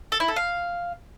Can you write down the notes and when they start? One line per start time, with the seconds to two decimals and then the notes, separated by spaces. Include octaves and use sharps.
0.12 A4
0.20 E4
0.28 A4
0.36 F5